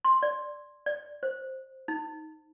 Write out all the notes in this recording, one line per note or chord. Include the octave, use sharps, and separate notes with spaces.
C6
D5
D5
C5
D#4